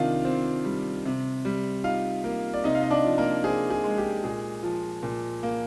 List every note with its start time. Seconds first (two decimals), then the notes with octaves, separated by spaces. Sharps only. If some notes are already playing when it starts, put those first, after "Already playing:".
Already playing: C3 D#3 D4 F4 F5
0.25 C4
0.65 G3
1.05 C3
1.45 G3
1.84 D#4 F4 F5
2.24 A#3
2.54 D5
2.64 C3 D#4 D#5
2.75 F5
2.82 D#5
2.90 D4 D5
3.05 F3
3.18 A#3 A#4
3.44 C4 G#4
3.70 G#4
3.84 G#3
3.98 G4
4.24 A#2 G#4
4.63 F3
5.03 A#2
5.43 A#3